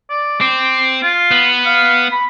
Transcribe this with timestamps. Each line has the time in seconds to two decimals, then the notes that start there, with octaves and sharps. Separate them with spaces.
0.10 D5
0.41 C4 D6
1.03 F4
1.31 B3
1.66 F5
2.12 B5